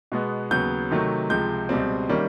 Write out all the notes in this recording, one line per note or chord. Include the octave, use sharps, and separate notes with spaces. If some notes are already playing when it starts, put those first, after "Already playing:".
B2 G#3 B3
D#2 C#3 F#3 B3 G6
C3 D#3 F#3 A3
C#2 C3 F3 G#3 G6
C#2 B2 G3 C4
D#3 G3 A#3 C#4